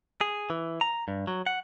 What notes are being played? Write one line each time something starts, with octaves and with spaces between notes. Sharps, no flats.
G#4
E3
A#5
G2
F#3
F#5